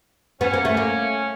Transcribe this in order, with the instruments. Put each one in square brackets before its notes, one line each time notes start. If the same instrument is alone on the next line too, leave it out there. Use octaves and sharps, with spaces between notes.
[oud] B3 [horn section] C#4
[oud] A#3
A3
A#3